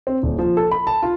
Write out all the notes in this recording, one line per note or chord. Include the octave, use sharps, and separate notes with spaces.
C4
D#1
F3
A4
B5
A5
F4